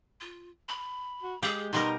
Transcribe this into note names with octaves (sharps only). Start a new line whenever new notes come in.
F4
B5
F#4
G#3 G4 G#4
B2 G3 D#4 A#4 C6